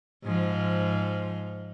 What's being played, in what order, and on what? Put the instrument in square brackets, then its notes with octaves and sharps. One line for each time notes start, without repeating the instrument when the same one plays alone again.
[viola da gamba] G#2 F3